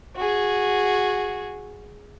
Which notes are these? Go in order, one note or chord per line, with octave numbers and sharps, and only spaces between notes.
F#4 G#4